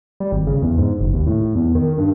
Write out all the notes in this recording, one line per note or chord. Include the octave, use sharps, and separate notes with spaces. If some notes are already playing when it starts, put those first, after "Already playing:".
G3
G#1
C#3
E2
G#2
F#1
D#2
A2
E2
D#3
G2